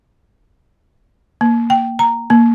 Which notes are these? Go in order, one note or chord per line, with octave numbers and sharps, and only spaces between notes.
A#3
G5
A#5
A#3